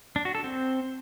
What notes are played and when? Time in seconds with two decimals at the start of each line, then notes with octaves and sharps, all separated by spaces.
0.16 D4
0.25 F#4
0.35 A4
0.44 C4